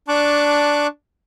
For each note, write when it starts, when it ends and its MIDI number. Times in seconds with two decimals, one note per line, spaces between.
0.08 0.87 62
0.08 0.87 81
0.08 0.87 85
0.08 0.87 86
0.08 0.87 90